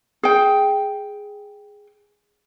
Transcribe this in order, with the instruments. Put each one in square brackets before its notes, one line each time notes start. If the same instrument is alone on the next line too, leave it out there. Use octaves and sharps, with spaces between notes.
[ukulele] G#4 G5